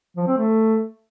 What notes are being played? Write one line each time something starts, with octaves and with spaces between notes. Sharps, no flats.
F3
C4
A3